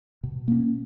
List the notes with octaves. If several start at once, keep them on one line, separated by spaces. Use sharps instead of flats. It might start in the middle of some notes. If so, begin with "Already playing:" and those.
B2
A#3 C#4